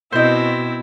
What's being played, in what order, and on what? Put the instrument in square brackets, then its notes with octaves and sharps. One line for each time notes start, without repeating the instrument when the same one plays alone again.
[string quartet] B2 [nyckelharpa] C4 E4 [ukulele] C5 D#5